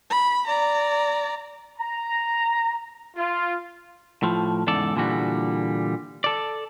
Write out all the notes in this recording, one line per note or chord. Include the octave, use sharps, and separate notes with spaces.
B5
D5 A#5
A#5
F4
A2 F3
E2 G#2 C#3 A4 D5
A#2 D3 E3 G3 F#4
A4 D5